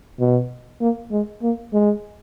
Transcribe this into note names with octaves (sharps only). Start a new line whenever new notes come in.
B2
A#3
G#3
A#3
G#3